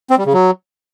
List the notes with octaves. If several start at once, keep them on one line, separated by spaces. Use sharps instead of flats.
C4
G3
C#3
F#3